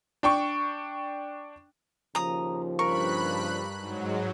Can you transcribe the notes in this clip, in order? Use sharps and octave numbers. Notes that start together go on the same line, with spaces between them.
D4 G5 C#6
D#2 C#3 F3 A#5 D#6
G2 A#4 B5 C#6 F#6
G#2 F#3